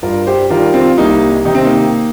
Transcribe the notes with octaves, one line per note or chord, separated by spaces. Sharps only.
G2 F4 A#4
G4 C5
D#3 G3 F4 A#4
C4 F4
C2 A#3 D#4
C3 D#3 D#4
C4
A#3 D#4